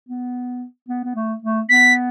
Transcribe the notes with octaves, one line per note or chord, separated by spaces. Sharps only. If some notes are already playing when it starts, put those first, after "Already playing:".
B3
B3
B3
A3
A3
B3 B6